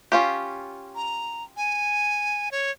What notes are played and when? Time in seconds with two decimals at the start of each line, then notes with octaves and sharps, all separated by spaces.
0.12 C#4 F4 G4
0.95 A#5
1.57 G#5
2.52 C#5